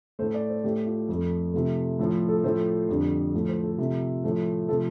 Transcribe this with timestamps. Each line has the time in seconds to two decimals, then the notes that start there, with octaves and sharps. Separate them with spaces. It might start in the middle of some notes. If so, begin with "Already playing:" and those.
0.19 A2 A3 C5
0.34 D5
0.49 C5
0.64 A2 A3 G4
0.86 F4
1.08 F2 F3 A3
1.54 C3 F3 A3
1.99 A2 F3 A3
2.29 A4
2.44 A2 F3 A3 C5
2.89 F2 D3 G3
3.34 A2 F3 A3
3.48 C5
3.64 A4
3.78 C3 F3 A3
4.24 A2 F3 A3
4.69 C3 F3 A3 A4